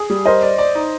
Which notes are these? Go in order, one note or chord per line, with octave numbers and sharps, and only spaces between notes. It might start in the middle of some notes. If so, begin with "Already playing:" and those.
Already playing: G#4
G3
A#4 C5 D#5
D5
D5
D#4